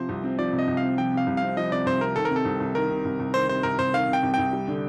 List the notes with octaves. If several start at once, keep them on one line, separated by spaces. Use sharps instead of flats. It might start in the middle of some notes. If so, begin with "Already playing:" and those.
Already playing: C3 F3 C5
C2
C4
F3 D5
C3
D#5
C2
F5
C4
F3 G5
C3 F5
C2
C4 F5
F3 D#5
C3 D5
C2 C5
C4 A#4
D#3 A4
A#4
C3
A4
C2
C2
D#3 A#4
C3
C2
C2
D#3 C5
C3 C5
C2 A#4
C2 C5
D#3 F5
C3
G5
C2
C2 G5
G3
D3